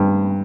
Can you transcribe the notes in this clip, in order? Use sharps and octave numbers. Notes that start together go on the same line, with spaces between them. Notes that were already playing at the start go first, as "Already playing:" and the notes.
Already playing: G2